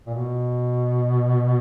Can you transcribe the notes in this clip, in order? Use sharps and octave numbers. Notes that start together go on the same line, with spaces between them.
A#2
B2